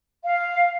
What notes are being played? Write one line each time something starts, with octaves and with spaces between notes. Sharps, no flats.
F5